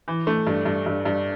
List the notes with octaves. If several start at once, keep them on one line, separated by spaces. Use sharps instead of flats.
E3
A3
G2
G2
G2
G2